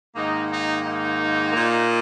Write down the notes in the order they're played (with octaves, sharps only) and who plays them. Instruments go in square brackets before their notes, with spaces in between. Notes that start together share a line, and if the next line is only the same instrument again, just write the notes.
[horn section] G#2 D#3 A#3 D#4
D#4
D#4
A#2 A#3